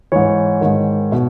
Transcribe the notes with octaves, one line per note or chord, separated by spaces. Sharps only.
G#2 E3 C#5
G#2 D#3
B2